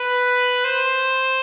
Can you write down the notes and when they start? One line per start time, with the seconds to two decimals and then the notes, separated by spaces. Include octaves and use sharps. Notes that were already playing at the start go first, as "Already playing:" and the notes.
Already playing: B4
0.65 C5